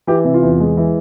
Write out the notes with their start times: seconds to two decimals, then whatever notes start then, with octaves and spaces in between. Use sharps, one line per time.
0.07 E3 G4
0.24 C3
0.34 F4
0.43 E2
0.60 G#3
0.77 E3